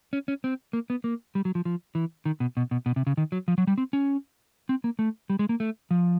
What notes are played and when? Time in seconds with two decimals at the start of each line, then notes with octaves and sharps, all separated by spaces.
0.13 C#4
0.28 C#4
0.44 C4
0.73 A#3
0.90 B3
1.04 A#3
1.35 G3
1.45 F#3
1.55 F3
1.65 F3
1.95 E3
2.25 D#3
2.40 B2
2.57 B2
2.71 B2
2.86 B2
2.96 C3
3.07 C#3
3.17 D#3
3.32 F#3
3.48 F3
3.58 F#3
3.67 G3
3.78 C4
3.93 C#4
4.69 C4
4.84 A#3
4.99 A3
5.30 G3
5.39 G#3
5.49 A#3
5.60 A3
5.91 F3